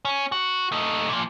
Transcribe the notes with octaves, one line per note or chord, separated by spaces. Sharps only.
C#4
F#4
A3 D#4
A#2 F3